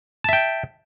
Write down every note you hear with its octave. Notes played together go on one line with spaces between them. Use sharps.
E5 G5 A5